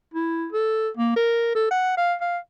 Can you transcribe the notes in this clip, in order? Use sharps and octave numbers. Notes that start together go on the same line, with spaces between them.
E4
A4
A#3
A#4
A4
F#5
F5
F5